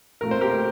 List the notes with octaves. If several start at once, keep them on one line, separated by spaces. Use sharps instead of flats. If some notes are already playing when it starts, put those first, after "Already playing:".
A#2 A3 C4 F4 A#4
C5
G4 A#4